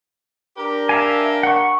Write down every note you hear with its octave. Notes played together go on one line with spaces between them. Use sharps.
D4 G4 A#4
E5 F5 G#5
F#5 C#6